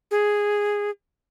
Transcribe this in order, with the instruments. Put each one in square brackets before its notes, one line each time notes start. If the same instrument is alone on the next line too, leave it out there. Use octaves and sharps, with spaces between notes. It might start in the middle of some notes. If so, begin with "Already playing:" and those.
[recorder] G#4